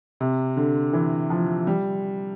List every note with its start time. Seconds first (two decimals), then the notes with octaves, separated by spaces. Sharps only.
0.21 C3
0.57 D3
0.93 E3
1.30 F3
1.67 G3